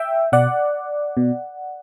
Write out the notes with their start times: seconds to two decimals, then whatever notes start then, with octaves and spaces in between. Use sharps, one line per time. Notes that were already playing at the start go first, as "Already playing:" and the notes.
Already playing: E5 G5
0.32 B2 D5 F#5
1.17 B2